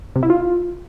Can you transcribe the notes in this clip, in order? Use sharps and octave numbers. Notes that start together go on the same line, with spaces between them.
C3
E4
F4